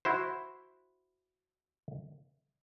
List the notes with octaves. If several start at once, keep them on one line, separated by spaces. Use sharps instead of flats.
E4 F#4 C5